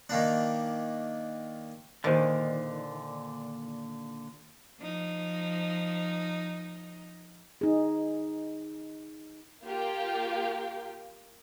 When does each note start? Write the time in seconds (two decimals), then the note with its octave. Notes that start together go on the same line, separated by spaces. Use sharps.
0.09 D#3 A#3 D4
2.04 A#2 D3 D#3 G4 C5 D#5
4.79 F3 D#4
7.61 D#4 G#4
9.63 A#3 F4 G4 A#4 F5 G5